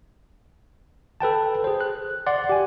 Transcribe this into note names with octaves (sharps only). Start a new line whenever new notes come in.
A4 B4 G5 A5
G#4 C5
F#6
D5 F#5 C6
G4 G#5